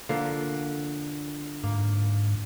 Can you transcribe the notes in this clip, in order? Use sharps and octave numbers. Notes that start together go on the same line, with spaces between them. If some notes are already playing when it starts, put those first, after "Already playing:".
D3 F3 A#3
G#2 A#3